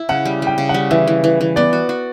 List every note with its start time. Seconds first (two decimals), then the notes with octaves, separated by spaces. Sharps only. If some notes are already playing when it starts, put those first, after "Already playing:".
Already playing: E4
0.09 C#3 F#5
0.25 G3
0.42 G3 G5
0.58 C#3
0.69 F#5
0.74 G3
0.91 E3 E5
1.07 E3
1.24 E3
1.41 E3
1.56 B3 D5
1.73 F#4
1.89 F#4